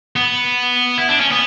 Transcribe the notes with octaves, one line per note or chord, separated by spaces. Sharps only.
B3
E4
D4
C#4
B3